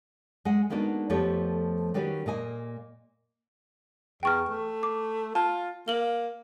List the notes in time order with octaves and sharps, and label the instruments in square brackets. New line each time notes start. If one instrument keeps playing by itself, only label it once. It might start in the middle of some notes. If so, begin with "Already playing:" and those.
[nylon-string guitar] G#3 F#5
G#3 A#3 B3 D4 D#4 F#4
F2 F3 A3 B3 G4 C#5
D#3 G3 C#4 F#4 B4
A#2 A#3 D#5 G#5
[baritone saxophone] E2 [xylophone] G5 C#6 F6
[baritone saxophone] A3
[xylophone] D6
[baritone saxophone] F4 [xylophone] A5
[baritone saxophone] A#3 [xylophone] F#7 G7